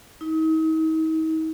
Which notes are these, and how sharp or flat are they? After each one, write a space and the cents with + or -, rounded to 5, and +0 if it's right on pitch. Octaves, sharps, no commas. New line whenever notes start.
D#4 +40